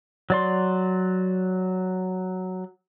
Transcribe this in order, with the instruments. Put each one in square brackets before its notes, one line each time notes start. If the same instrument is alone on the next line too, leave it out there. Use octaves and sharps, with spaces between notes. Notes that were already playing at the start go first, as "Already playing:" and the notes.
[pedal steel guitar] F#3 D5 C6